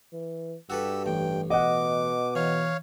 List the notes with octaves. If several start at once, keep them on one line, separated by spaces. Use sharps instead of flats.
E3
G2 F#4 G4 A4 B4 E6
A1 G5
B2 D#5 F#5 D6
E3 C#5 F5